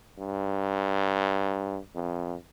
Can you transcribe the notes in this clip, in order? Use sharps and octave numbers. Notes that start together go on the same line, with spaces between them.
G2
F2